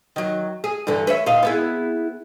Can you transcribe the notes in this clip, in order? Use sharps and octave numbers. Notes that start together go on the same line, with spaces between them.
D#3 F#3
G#4
G2 D3 E3
B4 C#5 E5
A#2 D#4 F5
B3 E4 G#4